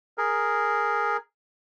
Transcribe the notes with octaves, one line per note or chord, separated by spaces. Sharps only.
G#4 A#4